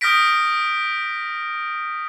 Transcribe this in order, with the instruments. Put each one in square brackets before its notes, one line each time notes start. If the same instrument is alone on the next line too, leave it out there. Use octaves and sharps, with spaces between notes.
[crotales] D#6 F6 G6 A#6 B6 D7